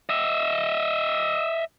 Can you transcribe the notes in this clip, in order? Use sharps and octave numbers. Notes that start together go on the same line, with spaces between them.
D#5 E5